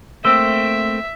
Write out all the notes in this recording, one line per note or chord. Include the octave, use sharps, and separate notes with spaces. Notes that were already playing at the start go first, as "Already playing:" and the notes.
A3 A#3 C4 C5 E5 E6